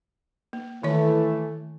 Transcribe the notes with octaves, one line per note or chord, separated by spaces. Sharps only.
A#3
D#3 E3 A3 E4 C#5